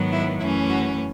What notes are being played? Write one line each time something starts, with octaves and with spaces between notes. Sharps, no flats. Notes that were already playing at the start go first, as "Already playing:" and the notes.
Already playing: G#2 D#3 F#3 B3
E4
F#2 E3 A3 C#4 E4
F#4